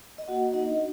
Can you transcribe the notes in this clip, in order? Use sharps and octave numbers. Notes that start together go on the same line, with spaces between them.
D#5
A#3 F#4 F#5
D#4 D#5
D4 F#4